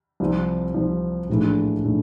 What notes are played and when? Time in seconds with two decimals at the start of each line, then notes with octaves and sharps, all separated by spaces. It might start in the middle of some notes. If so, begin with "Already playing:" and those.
0.20 C2 C3 F3 C4
0.74 C2 C3 F3 C4
1.29 A#1 A2 E3 A3 D4
1.83 A2 E3 A3 D4